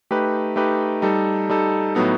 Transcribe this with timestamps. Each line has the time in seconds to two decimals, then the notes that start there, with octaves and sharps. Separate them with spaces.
0.11 A3 D#4 G4 B4
0.56 A3 D#4 G4 B4
1.02 G3 D#4 A4
1.50 G3 D#4 A4
1.95 A2 F#3 B3 D#4